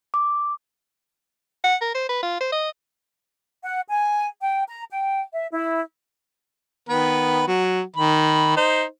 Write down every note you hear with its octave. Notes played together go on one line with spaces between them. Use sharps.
D6
F#5
A#4
C5
B4
F4
C5
D#5
F#5
G#5
G5
A#5
G5
E5
E4
D#3 B3 B4
F#3 F#4
D#3 B5
D#4 C5